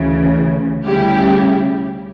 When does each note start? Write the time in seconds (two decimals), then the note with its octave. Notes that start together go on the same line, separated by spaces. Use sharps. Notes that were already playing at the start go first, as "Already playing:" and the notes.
Already playing: D2 C#3 E3
0.84 D2 C#3 G3 E4 G4